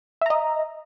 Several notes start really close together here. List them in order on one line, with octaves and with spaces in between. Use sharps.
E5 A#5 D#5